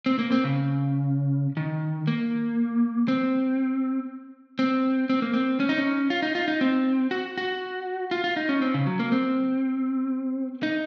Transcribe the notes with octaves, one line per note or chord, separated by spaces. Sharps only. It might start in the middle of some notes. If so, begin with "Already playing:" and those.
C4
A#3
C4
C#3
D#3
A#3
C4
C4
C4
A#3
C4
C#4
D#4
C#4
F4
D#4
F4
D#4
C4
F#4
F#4
F4
F4
D#4
C#4
C4
C#3
F#3
A#3
C4
D#4